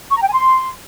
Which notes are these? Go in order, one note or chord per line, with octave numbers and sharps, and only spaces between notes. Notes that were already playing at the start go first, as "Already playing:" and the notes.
C#6
A#5
G5
G#5
C6